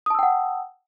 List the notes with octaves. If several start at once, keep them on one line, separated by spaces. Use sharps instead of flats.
F#5 G5 A5 D#6 E6